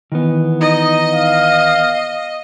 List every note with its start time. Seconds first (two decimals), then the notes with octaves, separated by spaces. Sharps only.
0.12 D#3 E3 B3
0.61 D#4 D#5
1.14 F5